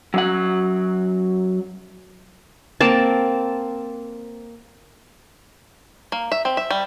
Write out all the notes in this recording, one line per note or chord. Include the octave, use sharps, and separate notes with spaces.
F#3 C#4 F#5
A#3 C4 A5
A#3
E5
C4
E5
G3